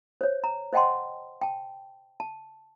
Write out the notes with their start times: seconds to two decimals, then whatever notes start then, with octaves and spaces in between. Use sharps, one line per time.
0.21 C5 C#5
0.44 A#5
0.73 C5 D#5 F#5 G5 A5 C6
1.41 G5 A5
2.20 A5